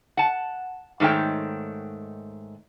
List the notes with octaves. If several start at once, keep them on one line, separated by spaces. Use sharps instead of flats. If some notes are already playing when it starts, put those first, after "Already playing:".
F#5 A5
G#2 D#3 A3 C#5 G5